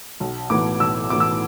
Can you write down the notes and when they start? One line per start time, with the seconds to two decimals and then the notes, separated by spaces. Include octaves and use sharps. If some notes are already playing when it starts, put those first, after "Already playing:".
0.20 B1
0.50 A2 E3 B3 D6
0.80 B1 E6
1.10 A2 E3 B3 D6
1.20 E6